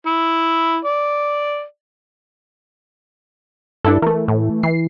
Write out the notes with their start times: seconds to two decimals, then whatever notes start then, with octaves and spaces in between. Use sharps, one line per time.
0.07 E4
0.85 D5
3.84 G2 D4 E4 A4
4.02 E3 A3 A#4
4.28 A2
4.63 E3 C7